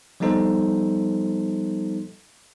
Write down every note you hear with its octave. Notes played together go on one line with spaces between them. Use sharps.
F3 G3 B3 D#4 A4 C5